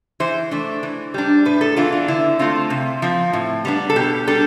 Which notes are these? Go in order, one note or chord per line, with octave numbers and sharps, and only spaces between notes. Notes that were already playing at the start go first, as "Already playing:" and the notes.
E3 C5
A3 D4
E3
G3 D4
A2 B4
A4
E3 B3 D4 F4
F4
D3 E4
A3 C4 F4
C3
F3 C4
A2
G3 B3 D4
A4
B2 G4
G3 D4 A4